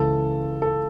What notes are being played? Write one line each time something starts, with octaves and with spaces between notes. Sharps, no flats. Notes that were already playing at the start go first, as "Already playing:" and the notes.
Already playing: C#2 C#3 E3 A4
A4